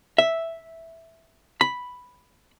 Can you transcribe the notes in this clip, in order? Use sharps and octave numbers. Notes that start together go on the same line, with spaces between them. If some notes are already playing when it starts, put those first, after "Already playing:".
E5
B5